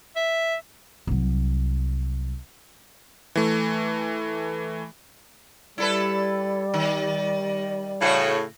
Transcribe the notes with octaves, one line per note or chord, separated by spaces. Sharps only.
E5
C2 F#3
E3 A3
G3 E4 A4 B4 D5
D#3
A2 C#3 F#4 C#5